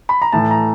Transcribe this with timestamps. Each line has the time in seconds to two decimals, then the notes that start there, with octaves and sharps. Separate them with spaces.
0.09 B5
0.22 A#5
0.32 A2 E3 A5
0.51 A#5